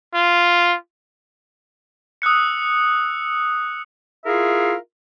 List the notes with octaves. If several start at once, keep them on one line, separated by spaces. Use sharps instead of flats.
F4
D#6 E6 F#6 C#7
E4 F4 G#4 A#4 E5 F5